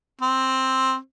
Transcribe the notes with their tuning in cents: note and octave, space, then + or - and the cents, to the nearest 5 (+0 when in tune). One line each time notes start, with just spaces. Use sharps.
C4 +5